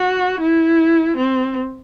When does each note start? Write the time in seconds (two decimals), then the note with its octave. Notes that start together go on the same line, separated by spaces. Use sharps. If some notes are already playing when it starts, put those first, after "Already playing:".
Already playing: F#4
0.41 E4
1.17 C4